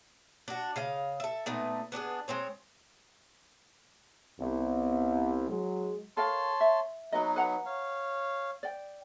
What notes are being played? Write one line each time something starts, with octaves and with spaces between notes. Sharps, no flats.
D4 F#4
C#3 D#5 F5
A4 E5
A#2 A3 B3 D#4
B3 D4 G4 G#4
G#3 C4 C5 C#5
C2 B3
F#3 G#3
A4 A#4 C#5 F5 A5 C6
E5
F#3 B3 D#4 F#4 D#5
B4 F#5 A#5
C#5 F5
D5 G5